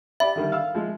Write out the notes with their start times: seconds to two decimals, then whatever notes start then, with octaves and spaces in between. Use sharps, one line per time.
0.20 G4 D5 E5 B5
0.36 D3 D#3 G3
0.52 F5 E6
0.75 F3 G#3